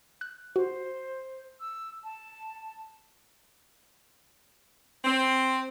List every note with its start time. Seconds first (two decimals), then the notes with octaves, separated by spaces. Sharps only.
0.21 F#6
0.56 F#4 C5
1.60 E6
2.04 A5
5.04 C4